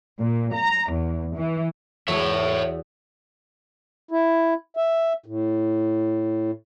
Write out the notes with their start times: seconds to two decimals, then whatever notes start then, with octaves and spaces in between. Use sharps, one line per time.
0.20 A#2
0.55 A#5
0.92 E2
1.36 E3
2.08 E2 F#4 C#5 E5 E6
4.11 E4
4.77 E5
5.26 A2